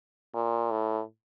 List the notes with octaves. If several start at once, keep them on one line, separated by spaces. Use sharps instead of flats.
A#2
A2